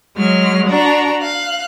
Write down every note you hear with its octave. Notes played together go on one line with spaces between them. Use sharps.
F#3 G#3 F6
D4 F#4 A#5
F5 F#6